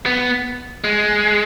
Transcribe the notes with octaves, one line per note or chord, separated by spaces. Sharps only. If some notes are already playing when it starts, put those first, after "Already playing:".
B3
G#3